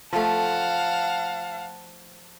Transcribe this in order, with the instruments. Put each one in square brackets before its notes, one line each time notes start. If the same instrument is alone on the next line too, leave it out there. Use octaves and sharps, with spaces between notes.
[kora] F3 A3 [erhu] F5 [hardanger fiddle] F#5 A5